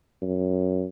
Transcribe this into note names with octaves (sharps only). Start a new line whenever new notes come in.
F#2